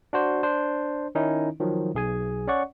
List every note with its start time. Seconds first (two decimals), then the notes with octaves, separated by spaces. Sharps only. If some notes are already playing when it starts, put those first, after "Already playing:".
0.13 D4 F#4 C5 D5
0.43 D4 C5
1.15 D#3 C#4 D#4 E4
1.60 D#3 F3 F#3
1.95 B1 G#4 G#5
2.48 C#4 C#5 D5 F#5 C#6